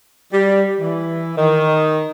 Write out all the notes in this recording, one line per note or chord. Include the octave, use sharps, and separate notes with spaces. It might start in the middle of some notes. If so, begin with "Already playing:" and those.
G3
E3
D#3